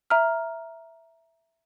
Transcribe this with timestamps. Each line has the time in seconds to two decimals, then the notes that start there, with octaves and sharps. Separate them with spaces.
0.10 E5 A#5 F6